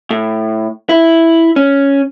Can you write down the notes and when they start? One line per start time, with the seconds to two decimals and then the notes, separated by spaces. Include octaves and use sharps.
0.10 A2
0.89 E4
1.56 C#4